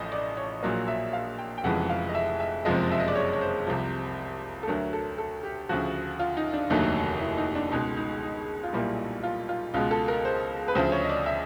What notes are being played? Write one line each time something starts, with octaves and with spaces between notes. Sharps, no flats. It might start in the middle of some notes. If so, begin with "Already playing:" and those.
Already playing: A1 A2 F3 A3 D#5
D5
C#5
A#1 A#2 F#3 A#3 D#5
E5
F5
G5
G5
F1 F2 C#3 E3 G#3 F#5
F5
D#5
E5
E5
F#1 F2 C3 F3 G#3 D#5
E5
D#5
D5
C#5
C#5
C5
C2 C3 F3
A4
D2 D3 F#3 A3 A#4
A4
A4
G4
D2 C#3 F3 F#4
F4
D#4
D4
F1 D#2 D3 F#3 A3 D#4
E4
D#4
D4
C#2 B2 G#3 D#4
D#4
D#4
F4
B1 A#2 G3 A#3 E4
F4
F4
C#2 B2 G#3 F4
A4
A#4
C5
B4
D2 C#3 F3 C5
C#5
D#5
D5
E5